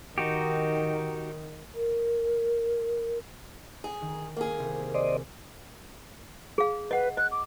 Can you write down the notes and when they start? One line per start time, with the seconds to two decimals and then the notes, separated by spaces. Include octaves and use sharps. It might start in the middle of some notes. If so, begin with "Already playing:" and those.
0.18 D#3 D#4 F#4 G4
1.75 A#4
3.84 G#4
4.01 D#3
4.36 A#3 G#4
4.58 C2
4.95 C5 D5 D#5
6.58 G#4 F5
6.91 B4 D#5 F#5
7.17 D#5 F#6
7.32 D6